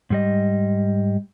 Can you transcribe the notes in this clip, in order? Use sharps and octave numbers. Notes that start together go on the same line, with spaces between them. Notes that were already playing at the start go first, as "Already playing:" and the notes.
G#2 G3 D#5